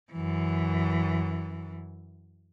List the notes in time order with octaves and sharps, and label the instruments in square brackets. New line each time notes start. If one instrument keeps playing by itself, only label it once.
[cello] F#2 E3